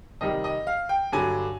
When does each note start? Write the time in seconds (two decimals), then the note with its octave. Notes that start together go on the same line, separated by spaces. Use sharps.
0.21 F2 C3 D#3 G3 D#5
0.44 D#5
0.67 F5
0.89 G5
1.12 G2 D3 F#3 G#5